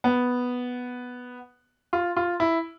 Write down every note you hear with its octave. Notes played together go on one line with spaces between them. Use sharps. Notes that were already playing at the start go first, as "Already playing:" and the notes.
B3
F4
F4
E4